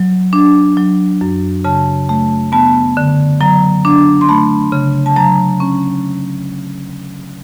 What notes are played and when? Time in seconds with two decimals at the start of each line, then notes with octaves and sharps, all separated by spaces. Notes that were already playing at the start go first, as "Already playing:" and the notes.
Already playing: F#3
0.33 D4
0.77 F#3
1.21 F#2
1.64 C#3 A5
2.09 A3
2.52 B3 A5
2.97 D3
3.41 F#3 A#5
3.85 D4
4.21 C6
4.29 A3 B5
4.72 C#3
5.06 A5
5.16 F#3 A#5
5.60 C#4